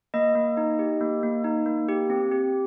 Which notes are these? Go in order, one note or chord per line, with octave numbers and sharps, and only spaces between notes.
A#3 D#5
A#3
D#4
G4
A#3
A#3
D#4
A#3
G4
C4
G4